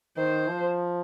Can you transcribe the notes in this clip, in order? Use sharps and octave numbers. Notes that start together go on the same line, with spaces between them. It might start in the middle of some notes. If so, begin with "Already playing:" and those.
D#3 C5
F3